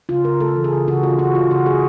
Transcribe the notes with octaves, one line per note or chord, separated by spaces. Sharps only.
C#3 F4
C#3 A#4
A3 A4
E3
G#4
C#3
C#3 F#4
A3 F4
E3 F#4
C#3 F4
C#3 F#4
A3 G#4